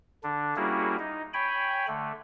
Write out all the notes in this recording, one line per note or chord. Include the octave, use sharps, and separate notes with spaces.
D3 D4
G3 A#3 C#4 E4 F#4 G#4
D#4
C#5 G5 G#5 B5
D3 A3